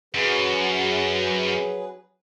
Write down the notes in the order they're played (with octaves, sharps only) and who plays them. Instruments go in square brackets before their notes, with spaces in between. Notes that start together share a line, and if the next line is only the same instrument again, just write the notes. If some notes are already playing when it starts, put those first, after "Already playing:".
[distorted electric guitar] F#2 [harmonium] F#3 G#4 B4